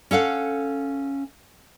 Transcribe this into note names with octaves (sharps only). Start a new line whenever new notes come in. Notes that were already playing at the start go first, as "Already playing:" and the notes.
C#4 A4 F5 F#5